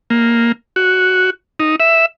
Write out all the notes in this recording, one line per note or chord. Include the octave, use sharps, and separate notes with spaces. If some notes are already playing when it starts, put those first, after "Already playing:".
A#3
F#4
D#4
E5